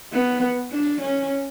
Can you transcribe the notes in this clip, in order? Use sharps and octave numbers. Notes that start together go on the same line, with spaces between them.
B3
D4
C#4